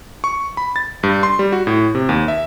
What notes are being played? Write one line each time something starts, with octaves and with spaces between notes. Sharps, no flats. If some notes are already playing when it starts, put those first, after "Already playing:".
C#6
B5
A6
G2
C6
G3
F#4
A2
C3
D#2
E5